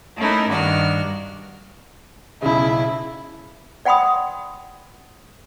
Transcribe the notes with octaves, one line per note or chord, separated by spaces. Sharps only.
A3 C#4 D#4 E4 A#4
G2 D#3 D4 F#4 F6
B1 C#3 E4
D5 F#5 G5 B5 C6 D#6